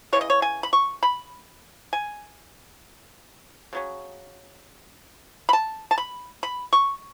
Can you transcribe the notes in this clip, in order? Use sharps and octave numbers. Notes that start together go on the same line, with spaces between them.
C#3 E3 G#3 C#5
D#5
C#5
G#5
B5
C#6
B5
G#5
C#3 F#3 C#4
B5
A5
A5
B5
B5
C#6